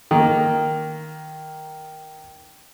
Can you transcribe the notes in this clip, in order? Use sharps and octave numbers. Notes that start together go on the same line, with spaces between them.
D#3 A#3